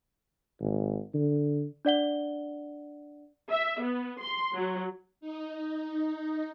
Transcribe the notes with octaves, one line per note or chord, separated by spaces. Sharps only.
G#1
D3
D4 D5 F#5 G7
E5
B3
C6
F#3
D#4